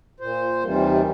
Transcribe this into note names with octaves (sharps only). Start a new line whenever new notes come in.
A#2 C5
D#2 C3 D#3 E3 G3